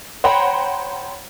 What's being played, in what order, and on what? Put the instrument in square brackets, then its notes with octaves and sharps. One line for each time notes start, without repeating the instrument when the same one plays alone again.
[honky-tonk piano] C5 C#5 F#5 G5 A#5 B5